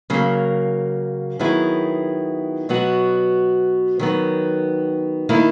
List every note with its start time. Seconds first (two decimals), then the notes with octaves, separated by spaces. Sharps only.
0.10 C#3 F#3 A#3
1.39 D#3 F#3 B3 E4 G#4
2.69 B2 F#3 B3 F#4
3.99 D#3 F#3 B3
5.29 D#3 A#3 E4